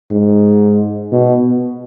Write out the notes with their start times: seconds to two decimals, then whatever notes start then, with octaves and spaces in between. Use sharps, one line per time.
0.11 G#2
1.12 B2